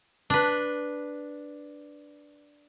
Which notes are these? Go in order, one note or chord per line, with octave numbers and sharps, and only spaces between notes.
D4 B4